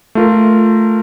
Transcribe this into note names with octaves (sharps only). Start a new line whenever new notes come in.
A3 F4 A#4